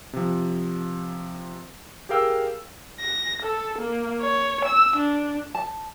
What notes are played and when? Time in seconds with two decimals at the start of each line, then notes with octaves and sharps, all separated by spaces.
0.13 C3 F3
2.09 G4 G#4 A#4 F5 G5 E6
3.00 A#6
3.43 A4
3.79 A#3
4.22 C#5
4.66 E6
4.97 D4
5.55 A5